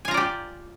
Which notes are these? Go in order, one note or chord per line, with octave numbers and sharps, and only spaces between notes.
F4 G4 D5 G#5 A#5